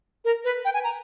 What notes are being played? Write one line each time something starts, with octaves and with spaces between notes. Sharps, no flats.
A#4
B4
G5
G#5
A#5